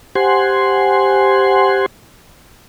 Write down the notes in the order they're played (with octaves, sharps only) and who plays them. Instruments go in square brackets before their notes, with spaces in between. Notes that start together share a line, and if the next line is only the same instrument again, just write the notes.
[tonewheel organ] G4 C5 F#5 G#5 C6